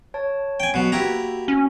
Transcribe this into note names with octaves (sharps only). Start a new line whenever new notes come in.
C#5 A5
G5 G#5
B2 F#3 B4
A#3 E4 F#4 G4 A#5
C#4